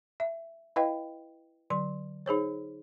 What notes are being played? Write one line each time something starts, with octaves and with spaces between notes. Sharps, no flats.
E5
E4 B4 D#5 F5 G5
D3 F#3 C6
D#4 G#4 C5 C#5